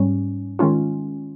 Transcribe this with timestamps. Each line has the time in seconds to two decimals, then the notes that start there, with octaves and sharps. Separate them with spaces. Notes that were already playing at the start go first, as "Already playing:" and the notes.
Already playing: G#2 G3 C#4
0.59 D#3 G#3 C#4 F4